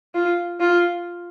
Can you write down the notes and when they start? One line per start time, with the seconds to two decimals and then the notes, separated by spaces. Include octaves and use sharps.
0.14 F4
0.60 F4